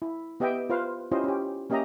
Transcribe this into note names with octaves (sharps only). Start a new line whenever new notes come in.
E4
B3 G4 D#5 E5 G5
F4 B4 C5 F5
C#4 E4 F4 G4 C5 D#5
C#4 G4
A#3 C#4 G4 D#5 E5 A#5